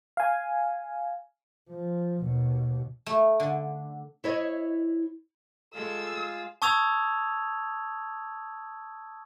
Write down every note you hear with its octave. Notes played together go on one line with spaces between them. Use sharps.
F5 G#5
F3
D#2 B2
A3
D3
E4 C#5 D#5
G#3 F4 G#4 A4 F5 E6
A5 C#6 D#6 E6 G#6 F7